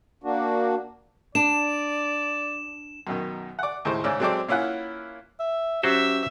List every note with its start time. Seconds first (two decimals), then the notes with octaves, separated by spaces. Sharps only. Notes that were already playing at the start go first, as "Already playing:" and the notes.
0.24 A#3 D4 F#4
1.35 D4 D5 E7
3.07 F#2 B2 D#3
3.59 D5 F#5
3.85 D#2 A2 G#3 C5
4.04 G#2 C#3 C#4 D5 E6
4.20 F#3 G#3 C4 A4 C5 D5
4.48 A#3 C#4 E4 F4 F#5
5.40 E5
5.83 F#3 C#4 F#4 G4 C5 E5